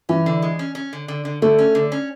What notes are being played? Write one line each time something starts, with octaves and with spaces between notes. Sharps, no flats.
E3 C#4
D3
G#3
C#4
C#4
D3
D3
D3
D3 A3
C#4
D3
C#4